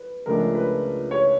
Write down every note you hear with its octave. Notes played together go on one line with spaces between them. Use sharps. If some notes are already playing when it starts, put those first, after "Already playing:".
Already playing: B4
C#2 C#3 F3 A3 D4 A#4
B4
C#5